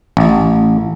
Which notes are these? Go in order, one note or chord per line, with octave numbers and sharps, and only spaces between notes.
A1